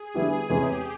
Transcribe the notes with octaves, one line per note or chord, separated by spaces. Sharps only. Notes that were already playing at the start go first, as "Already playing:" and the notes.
Already playing: G#4
D3 G3 B3 E4 G4
E2 C3 E3 G#3 C#4 G4